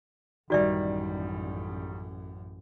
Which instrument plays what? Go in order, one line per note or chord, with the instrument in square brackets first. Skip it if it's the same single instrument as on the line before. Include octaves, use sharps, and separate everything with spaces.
[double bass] A1 F#2 [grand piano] D#3 G3 [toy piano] F#4 D5 E5